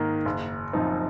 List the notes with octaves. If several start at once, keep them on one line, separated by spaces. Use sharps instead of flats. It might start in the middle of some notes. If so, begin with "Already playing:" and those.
Already playing: G#2 D#3 A#3
F#1
F#2 F3 C4 D#4